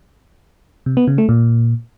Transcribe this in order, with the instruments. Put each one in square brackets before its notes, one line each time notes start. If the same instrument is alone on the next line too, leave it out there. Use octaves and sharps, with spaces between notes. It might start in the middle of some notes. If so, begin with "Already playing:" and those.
[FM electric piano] C3
B3
C#3
A3
A#2